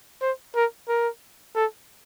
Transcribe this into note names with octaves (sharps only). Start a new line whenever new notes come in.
C5
A#4
A#4
A4